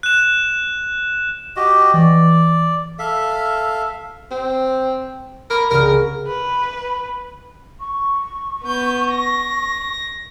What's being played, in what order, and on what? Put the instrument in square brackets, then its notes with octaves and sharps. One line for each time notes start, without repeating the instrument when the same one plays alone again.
[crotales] F#6 E7
[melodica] F#4 G4 D#5
[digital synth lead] E3 [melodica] D5
[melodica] A4 E5 F5 [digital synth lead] B6
[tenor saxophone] C4
[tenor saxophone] A#4 [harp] B5
[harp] C2 C#3 [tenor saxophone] A#4
[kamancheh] B4 [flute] B5
[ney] C#6
[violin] B3 G6
A#6